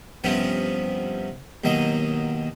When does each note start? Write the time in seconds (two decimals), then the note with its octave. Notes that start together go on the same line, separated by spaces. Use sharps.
0.24 G2 C3 F3 B3 C#4
1.64 D#2 B2 F#3 D#5 D#6